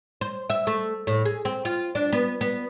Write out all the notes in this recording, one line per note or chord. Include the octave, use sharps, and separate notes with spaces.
C5
E5
A3
A2
G#4
C4
F4
D4
B3
B3